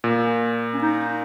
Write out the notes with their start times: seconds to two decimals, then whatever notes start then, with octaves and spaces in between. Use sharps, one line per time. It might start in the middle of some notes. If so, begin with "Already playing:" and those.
0.04 A#2
0.74 C#4
0.82 D#4